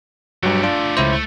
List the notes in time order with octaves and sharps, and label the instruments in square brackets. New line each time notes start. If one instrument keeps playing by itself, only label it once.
[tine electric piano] G2 F#3 [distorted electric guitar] A3 G4
[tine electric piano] D4 F4
C#2 E4 C5
[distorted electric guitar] A3